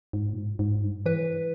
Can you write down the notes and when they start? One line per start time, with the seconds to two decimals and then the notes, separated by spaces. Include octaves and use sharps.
0.13 G#2
0.33 A#2
0.37 G#2
0.59 G#2
0.83 G2
1.06 E3 B4